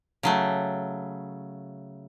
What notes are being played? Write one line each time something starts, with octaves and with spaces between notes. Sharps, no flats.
C#3 F#3 A3